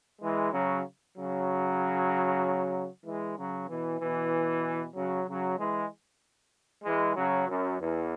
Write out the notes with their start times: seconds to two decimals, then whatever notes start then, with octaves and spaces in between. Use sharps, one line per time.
0.21 E3 G#3
0.53 C#3 F#3
1.16 C#3 F#3
3.05 E3 G#3
3.37 C#3 F#3
3.68 B2 E3
4.00 B2 E3
4.95 C#3 F#3
5.27 C#3 F#3
5.58 E3 G#3
6.84 E3 G#3
7.16 C#3 F#3
7.48 F#2
7.80 E2